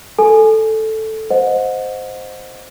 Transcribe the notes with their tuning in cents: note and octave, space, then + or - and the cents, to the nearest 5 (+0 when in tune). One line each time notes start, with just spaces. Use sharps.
A4 +0 G#5 +10
C5 +0 D#5 +0 F#5 -30